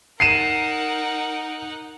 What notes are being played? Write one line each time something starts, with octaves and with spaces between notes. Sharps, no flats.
D#4 A#4 F#5 C7 D#7 E7